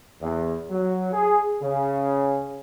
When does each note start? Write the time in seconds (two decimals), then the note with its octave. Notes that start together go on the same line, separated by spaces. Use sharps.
0.21 E2
0.70 F#3
1.12 G#4
1.61 C#3